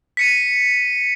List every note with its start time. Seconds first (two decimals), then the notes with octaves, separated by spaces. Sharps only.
0.17 B6 C#7 D#7